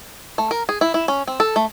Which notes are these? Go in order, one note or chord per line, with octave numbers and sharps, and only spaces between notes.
A3
A#4
G#4
E4
E4
C#4
C4
A4
A3